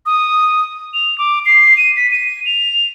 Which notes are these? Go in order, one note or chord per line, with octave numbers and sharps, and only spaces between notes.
D#6
F7
D6
C7
D#7
B6
D#7
F7